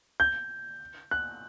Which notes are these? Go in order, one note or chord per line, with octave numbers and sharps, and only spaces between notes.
G6
F#6